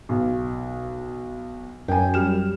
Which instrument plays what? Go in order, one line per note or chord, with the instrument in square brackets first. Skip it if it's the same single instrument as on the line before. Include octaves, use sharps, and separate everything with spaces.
[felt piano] B1
[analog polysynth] F#2 [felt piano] G5 G#5
[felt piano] G3 F6 E7